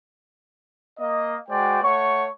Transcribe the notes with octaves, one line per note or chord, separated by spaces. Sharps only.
A#3 D#5
G#3 F#4 C5 D5 G5
A3 C#5 F#5 C#6